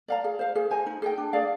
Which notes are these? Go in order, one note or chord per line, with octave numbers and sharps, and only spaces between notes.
D5 F5 A#5
G#4
C5 F5
G#4
C5 D#5 G#5
D#4
G#4 D#5 G5
D4
G#4 D5 F5